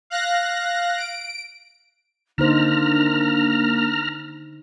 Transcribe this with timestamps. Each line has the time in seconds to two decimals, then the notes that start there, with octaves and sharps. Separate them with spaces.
0.10 F5 F#6 A#6
0.98 D7
2.38 D3 A#3 D4 D#4 C5 A#5 F6